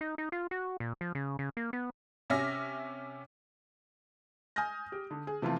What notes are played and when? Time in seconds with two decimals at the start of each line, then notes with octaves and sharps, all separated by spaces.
0.01 D#4
0.18 D#4
0.32 F4
0.51 F#4
0.80 A#2
1.01 F3
1.15 C#3
1.39 C#3
1.57 A#3
1.73 B3
2.30 C3 C#4 E5 F6 A#6
4.56 G#5 D#6 F6 G6 A#6
4.92 G4
5.11 D3
5.27 G#4
5.42 C3 E3 F3 A3 F4